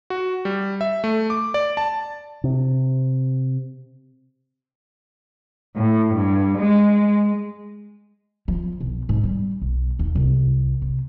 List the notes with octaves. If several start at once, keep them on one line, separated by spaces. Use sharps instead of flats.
F#4
G3
E5
A3
D6
D5
A5
C3
A2
G2
G#3
F3
B1
G#2
G3
B1
D#2
C2
C3